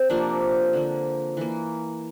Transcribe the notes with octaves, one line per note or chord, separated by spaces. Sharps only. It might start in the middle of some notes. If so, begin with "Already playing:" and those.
Already playing: C4
C3 F3 A#3 D4
D3 F3 A#3
E3 A#3